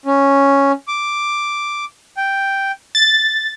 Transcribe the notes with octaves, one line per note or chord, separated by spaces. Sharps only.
C#4
D6
G5
A6